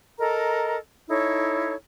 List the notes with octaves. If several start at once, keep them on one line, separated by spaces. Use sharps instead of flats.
A4 A#4 D#5 A#5
D#4 E4 A4 C#5